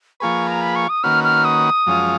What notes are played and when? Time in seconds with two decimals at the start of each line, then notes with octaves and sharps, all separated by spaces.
0.20 F3 A#3 F4 G#4 B4 C#6
0.47 A#5
0.62 B5
0.76 C#6
0.89 D#6
1.04 D#3 A#3 C#4 F#4 B4 F6
1.24 F6
1.45 D#6
1.87 F#2 F3 G#3 C#4 F4